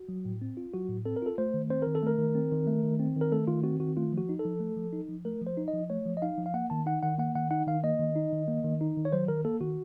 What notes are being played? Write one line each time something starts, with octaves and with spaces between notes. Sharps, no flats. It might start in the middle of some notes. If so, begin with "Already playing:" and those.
Already playing: F#4
F#3
A2
C4
F4
F#3 F#4
A2
C4 A4
A#4
F4 A4
A3 C5
D#3
C4 C5
D#3 A#4
A4
A3 A#4
D#3
C4
D#3
A3
D#3
C4
D#3
A#4
A3 A4
D#3 F4
C4 F#4
D#3 F#4
A3 F4
F3
F#4
D#4
A4
F3
A3
F3
D#4
F3
A3 A#4
F3
C5
D#4
D#5
F3
A3 C#5
F3
D#5
D#4 F5
F3
F5
A#3 F#5
D#3 A5
D#4 F#5
D#3 F#5
A#3 F#5
D#3 F#5
D#4 F#5
D#3 F5
A#3 D#5
D#3
D#4
D#3
A#3
D#3
D#4
D#3
C#5
F#3 C5
D#3 A#4
A#3 A4
D#3 F#4